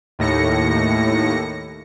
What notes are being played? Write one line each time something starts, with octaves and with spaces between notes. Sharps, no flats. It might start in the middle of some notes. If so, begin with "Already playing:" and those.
D#2 A2 A#6 C#7